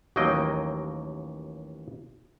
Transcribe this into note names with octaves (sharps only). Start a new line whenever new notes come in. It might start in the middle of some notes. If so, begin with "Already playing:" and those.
A1 D#2 F#3 A#3 D#5 G5